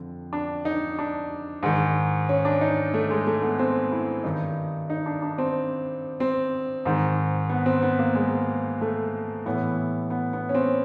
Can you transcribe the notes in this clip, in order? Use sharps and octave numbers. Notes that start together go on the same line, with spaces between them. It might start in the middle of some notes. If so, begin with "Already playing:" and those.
Already playing: F2 D3
D4
D#4
D4
G#2 D#3
C#4
D4
D#4
A3
G#3
A3
B3
C4
E4
G2 D#3 D#4
D#4
D4
D4
C4
C4
G#2 D#3
B3
C4
B3
A#3
G#3
A3
A2 E3 B3
B3
B3
C#4
C4